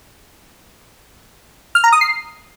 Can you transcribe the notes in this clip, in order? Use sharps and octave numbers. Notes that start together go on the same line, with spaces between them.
F6
A#5
D#6
C7